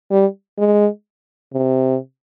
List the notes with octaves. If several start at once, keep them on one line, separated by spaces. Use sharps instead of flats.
G3
G#3
C3